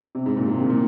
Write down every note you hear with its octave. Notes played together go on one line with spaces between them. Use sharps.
C3
G#2
A#2
C3
D#3
A#2